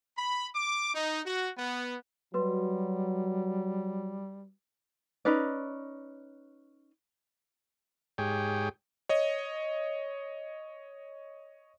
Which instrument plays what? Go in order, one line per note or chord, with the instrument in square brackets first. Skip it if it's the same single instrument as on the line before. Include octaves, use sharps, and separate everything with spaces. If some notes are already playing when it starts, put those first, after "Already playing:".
[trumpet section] B5
D6
D#4
F#4
B3
[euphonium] F#3 [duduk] G3 [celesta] F#4 B4 C6
[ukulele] C#4 D#4 B4 D5
[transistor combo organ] G#2 G4 G#4 C#5 G5
[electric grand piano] C#5 D#5